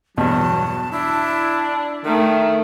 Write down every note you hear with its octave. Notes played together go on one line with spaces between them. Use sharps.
E2 G2 B2 F#3 A5
D4 E4
D#3 A3 A#4